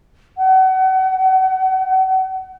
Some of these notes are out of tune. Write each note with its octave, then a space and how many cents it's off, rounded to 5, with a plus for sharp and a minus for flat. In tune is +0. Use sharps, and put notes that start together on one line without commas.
F#5 +35